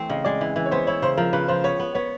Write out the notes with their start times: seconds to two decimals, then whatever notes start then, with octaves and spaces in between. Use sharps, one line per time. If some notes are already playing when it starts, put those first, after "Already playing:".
Already playing: E3 A3 C4
0.10 C#3 D#5
0.25 G#3 D5
0.41 E3
0.56 E3
0.66 C#5
0.71 B3 C5
0.87 E4 C#5
1.02 C#3 C5
1.17 F3 A#4
1.33 C#3 B4
1.48 F3 C5
1.64 B3 C#5
1.80 B3
1.95 B3 C#5